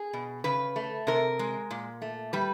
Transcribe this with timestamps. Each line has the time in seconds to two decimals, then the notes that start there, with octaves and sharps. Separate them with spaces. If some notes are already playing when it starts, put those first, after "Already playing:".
Already playing: G#4
0.13 B2
0.44 C#3 B4
0.76 A3
1.07 C3 A#4
1.39 G#3
1.71 A#2
2.02 A3
2.33 G3 B4